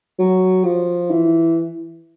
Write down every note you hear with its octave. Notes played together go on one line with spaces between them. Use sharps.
F#3
F3
E3